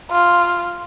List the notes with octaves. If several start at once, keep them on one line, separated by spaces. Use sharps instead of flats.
F4